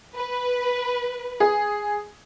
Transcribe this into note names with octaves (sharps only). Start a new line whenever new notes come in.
B4
G#4